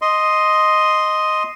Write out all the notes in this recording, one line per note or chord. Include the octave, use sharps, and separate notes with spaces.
D#5 C6